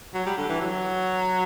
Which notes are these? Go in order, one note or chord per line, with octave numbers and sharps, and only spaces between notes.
F#3
G3
D3
E3
F#3